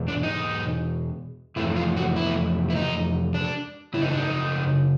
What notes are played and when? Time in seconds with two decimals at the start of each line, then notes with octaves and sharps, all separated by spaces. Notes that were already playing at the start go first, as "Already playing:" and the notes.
Already playing: E2 B2 G#3
0.08 D4
0.23 D#4
1.56 F2 C3 E3 A3 E4
1.76 F4
1.97 F#4
2.16 E4
2.70 E4
2.76 D#4
3.34 D4
3.94 F#2 C#3 E4
4.02 D#4
4.10 D4
4.18 D#4